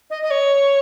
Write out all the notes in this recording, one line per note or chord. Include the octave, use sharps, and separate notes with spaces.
D#5
D#5
C#5